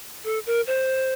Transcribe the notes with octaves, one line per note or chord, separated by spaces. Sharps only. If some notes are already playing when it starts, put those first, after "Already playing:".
A4
A#4
C5